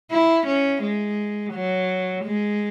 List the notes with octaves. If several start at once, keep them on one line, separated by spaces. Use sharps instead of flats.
E4
C#4
G#3
F#3
G#3